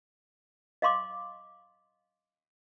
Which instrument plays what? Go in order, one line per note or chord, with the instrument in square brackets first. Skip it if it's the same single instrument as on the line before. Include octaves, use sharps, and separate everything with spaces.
[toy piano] D#5 F5 C6 D6